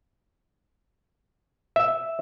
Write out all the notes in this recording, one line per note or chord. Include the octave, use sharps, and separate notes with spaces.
E5